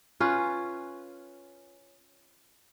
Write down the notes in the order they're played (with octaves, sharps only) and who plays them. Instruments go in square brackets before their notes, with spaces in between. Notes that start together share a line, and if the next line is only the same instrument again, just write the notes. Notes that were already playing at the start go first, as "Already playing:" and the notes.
[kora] C#4 F4 B4